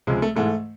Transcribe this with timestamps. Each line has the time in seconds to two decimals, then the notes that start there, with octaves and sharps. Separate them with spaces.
0.07 C#2 C3 F3 G#3
0.22 A3
0.35 G#2 E3 G#3 A3